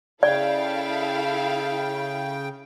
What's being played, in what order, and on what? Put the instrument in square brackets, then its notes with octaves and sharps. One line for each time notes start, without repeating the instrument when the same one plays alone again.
[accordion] C#3 G5 [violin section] E4 A4 F5 [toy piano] D5